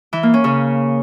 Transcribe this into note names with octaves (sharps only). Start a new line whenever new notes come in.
E3
A#3
C#4
C#3